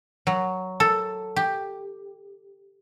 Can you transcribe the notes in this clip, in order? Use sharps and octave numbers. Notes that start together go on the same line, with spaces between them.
F#3
A4
G4